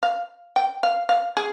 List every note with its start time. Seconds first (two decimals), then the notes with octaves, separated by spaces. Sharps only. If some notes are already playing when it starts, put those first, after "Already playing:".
0.03 F5
0.56 G5
0.83 F5
1.09 F5
1.37 G#4